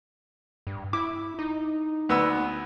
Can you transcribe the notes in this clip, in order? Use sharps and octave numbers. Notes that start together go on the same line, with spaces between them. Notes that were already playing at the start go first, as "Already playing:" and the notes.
G2
E4 D6
D#4
D2 B3 E6